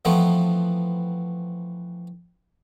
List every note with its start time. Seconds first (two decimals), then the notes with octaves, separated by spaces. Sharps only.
0.05 E3 F3 A3 B3 C4 E4